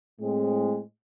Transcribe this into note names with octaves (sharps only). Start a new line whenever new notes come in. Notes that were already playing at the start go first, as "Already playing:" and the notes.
A2 G#3 C4